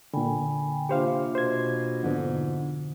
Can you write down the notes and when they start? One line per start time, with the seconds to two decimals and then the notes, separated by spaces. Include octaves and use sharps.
0.13 A#2 D3 G5 G#5 B5
0.89 C3 A#3 D4 F4 G4 C5 F5
1.35 B2 C5 G#6
2.03 F2 G#2 B2 D3